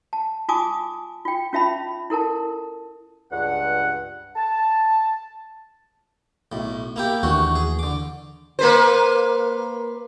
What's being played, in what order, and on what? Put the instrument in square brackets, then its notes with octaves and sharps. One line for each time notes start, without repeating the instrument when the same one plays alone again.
[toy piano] A5
F4 G#5 A5 D6 D#6
F4 G5
C#4 F4 E5 A5 B5
E4 A4 A#4 A5
[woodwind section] C#2 G2 F#5
A5
[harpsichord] B1 A2
A#3 E4 G4
[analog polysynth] D#2 E3 [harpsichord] A3 D4 F#4
[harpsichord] G#4
D3 D6
[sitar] A#3 B4 C5